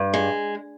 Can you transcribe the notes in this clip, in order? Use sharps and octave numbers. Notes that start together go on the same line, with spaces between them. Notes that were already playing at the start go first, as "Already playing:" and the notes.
Already playing: G2
G#3